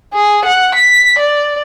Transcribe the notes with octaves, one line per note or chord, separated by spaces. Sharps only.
G#4
F#5
B6
D5